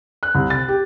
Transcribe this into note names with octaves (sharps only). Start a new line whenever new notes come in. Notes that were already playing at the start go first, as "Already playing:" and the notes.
F#6
C2
A6
G4